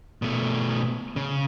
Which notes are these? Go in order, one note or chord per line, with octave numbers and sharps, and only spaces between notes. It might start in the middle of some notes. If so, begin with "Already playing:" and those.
B2 A3
C#3